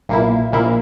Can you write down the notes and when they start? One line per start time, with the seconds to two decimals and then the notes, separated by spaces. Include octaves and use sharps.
0.09 B1 A#2 A#3 E4
0.52 A#1 A#2 A#3 E4